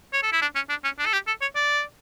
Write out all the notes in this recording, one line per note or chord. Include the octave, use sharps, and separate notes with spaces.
C#5
A4
E4
D4
C#4
D4
C#4
D4
A4
G4
A4
C#5
D5